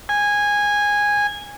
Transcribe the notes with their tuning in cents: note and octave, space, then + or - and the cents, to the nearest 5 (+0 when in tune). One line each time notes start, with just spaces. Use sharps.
G#5 -15